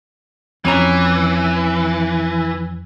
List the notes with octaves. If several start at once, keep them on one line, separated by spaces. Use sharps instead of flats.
F2 E3 C#4 A#5